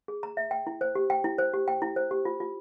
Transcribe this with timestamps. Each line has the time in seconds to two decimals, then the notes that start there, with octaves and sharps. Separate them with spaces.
0.08 G#4
0.23 A#5
0.37 E5
0.51 G5
0.67 E4
0.81 C5
0.95 G4
1.10 G5
1.24 E4
1.38 C5
1.54 G4
1.68 G5
1.82 E4
1.96 C5
2.11 G4
2.25 F4
2.40 F4